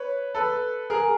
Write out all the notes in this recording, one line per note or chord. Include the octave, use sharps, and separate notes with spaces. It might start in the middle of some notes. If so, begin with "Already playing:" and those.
Already playing: B4 C#5
A4 B4
G#4 A#4